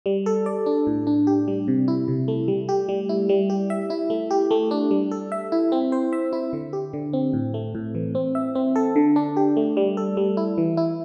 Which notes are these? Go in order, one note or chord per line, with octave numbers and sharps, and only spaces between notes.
G3
A4
D5
D4
A2
D4
G4
G3
C3
E4
C3
A3
G3
G4
G3
E4
G3
G4
E5
E4
A3
G4
A3
D4
G3
A4
E5
E4
C4
C5
E5
E4
D3
G4
D3
C4
A2
A3
A2
E3
C4
E5
C4
A4
D3
D4
G4
A3
G3
A4
G3
E4
E3
E4